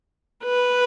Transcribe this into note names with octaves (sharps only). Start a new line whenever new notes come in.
B4